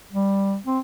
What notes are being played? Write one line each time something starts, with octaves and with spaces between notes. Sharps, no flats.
G3
C4